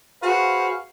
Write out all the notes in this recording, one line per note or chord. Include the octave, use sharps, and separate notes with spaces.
F#4 G#4 B4 C5 F5